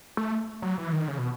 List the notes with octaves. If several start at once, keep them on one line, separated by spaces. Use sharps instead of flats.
A3
F#3
E3
D#3
C#3
B2